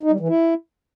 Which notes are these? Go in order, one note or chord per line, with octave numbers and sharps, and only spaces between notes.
D#4
G3
E3
E4